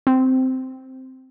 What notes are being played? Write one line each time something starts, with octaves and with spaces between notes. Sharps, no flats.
C4